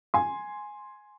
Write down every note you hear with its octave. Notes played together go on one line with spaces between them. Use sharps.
G#5 C6